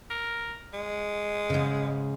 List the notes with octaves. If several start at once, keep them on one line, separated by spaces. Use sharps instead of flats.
A#4
G#3
G#2 C#3